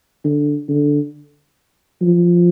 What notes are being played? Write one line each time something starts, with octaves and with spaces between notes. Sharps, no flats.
D3
D3
F3